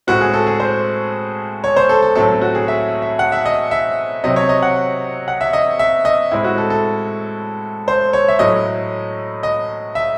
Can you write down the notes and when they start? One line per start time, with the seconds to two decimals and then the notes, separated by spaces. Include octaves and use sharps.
0.07 A2 G#3 C4 F#4
0.21 G#4
0.34 A4
0.47 G#4
0.60 C5
1.64 C#5
1.76 C5
1.89 A4
2.02 A4
2.16 A2 F#3 A3 C4 A4
2.28 A4
2.42 F#4
2.55 G#4
2.68 E5
3.02 E5
3.19 F#5
3.32 E5
3.46 D#5
3.71 E5
4.24 C3 F#3 C4 D#5
4.36 C#5
4.49 D#5
4.63 F#5
5.28 F#5
5.41 E5
5.53 D#5
5.79 E5
6.05 D#5
6.31 A2 G#3 C4 E4
6.44 F#4
6.58 A4
6.70 A4
7.88 C5
8.13 C#5
8.28 E5
8.39 A2 F#3 A3 D#5
9.43 D#5
9.95 E5